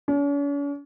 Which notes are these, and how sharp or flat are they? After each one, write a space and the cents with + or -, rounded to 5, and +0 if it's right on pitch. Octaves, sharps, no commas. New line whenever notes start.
C#4 +45